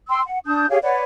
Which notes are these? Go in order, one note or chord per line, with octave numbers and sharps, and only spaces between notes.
G5 C6 E6
F#5
D4 A5 D#6 G6
G4 G#4 C#5 F5
B4 C#5 D5 F#5